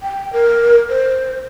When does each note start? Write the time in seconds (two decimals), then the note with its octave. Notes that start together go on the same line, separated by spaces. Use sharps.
0.02 G5
0.33 A#4
0.89 C5